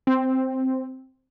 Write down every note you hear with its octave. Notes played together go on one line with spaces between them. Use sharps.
C4